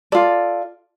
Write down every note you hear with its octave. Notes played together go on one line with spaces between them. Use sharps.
F4 A4 D5